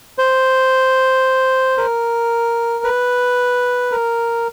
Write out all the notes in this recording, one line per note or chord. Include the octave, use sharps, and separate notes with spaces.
C5
A#4
B4
A#4